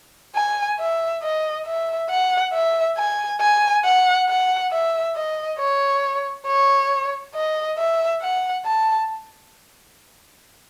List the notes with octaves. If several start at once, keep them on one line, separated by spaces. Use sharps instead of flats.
G#5
E5
D#5
E5
F#5
E5
G#5
G#5
F#5
F#5
E5
D#5
C#5
C#5
D#5
E5
F#5
A5